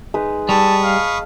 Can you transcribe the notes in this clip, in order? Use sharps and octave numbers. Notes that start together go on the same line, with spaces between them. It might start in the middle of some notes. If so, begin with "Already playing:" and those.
G#3 D#4 B4
G3 A5 B5 C#6 D#6 E6
F5